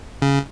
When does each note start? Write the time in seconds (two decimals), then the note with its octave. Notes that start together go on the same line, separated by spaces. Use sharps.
0.22 C#3